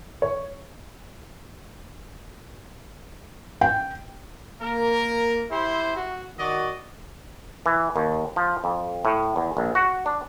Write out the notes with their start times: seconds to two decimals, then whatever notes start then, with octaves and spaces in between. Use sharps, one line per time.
0.22 C#5
3.61 G5
4.61 A#3 A#4
5.51 E4 G4 C5
5.96 F#4
6.38 D#3 F#4 D5 D#5
7.66 E3
7.96 D#2
8.36 F3
8.64 F2
9.05 A2
9.36 E2
9.57 A#1
9.75 F#4
10.06 D4